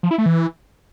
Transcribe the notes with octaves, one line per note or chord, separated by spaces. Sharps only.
F3
E4
A3
E3